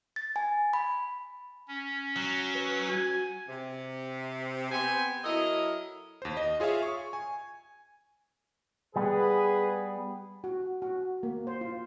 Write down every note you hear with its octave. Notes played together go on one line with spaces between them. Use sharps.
A6
G#5
B5
C#4
F#3
B4
F#4 G#5
C3
B3 C4 C5 G#5
F#3 E4 A4 A#4 D#5
D#2 C5
D#5
F4 G#4 C#5 E5 F5
C#6
G#5
G3 B3 G#4 B4
F#4
F#4
A#3
C5
F4